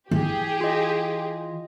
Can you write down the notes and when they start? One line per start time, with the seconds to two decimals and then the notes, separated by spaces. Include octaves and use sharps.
0.11 E3 G4 G#4
0.61 F4 D#5